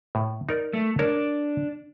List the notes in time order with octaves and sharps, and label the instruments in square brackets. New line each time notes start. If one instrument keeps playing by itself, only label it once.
[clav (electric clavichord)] A2
D#4 A#4 D5
[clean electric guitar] A3
[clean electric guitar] D4 [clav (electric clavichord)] A#4 C#5